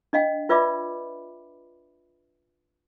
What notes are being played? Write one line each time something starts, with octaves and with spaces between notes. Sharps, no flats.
D4 D#5 F5 G5
F4 B4 D5 E5 B5 D6